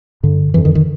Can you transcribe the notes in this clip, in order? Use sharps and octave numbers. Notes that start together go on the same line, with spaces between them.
G2 D3
F2 D3 E3
D#3
D#3